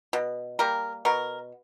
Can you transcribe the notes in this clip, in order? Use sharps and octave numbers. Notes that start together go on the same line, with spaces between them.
B2
G3 A#3 A#4
B2 A#4